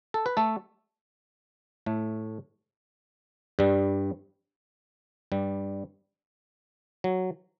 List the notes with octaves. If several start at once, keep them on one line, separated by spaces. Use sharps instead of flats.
A4
B4
A3 A4
A2 A3
G2 G3
G2 G3
F#3